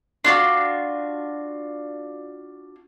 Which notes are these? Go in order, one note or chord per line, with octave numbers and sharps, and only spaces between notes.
D4 F4 F#4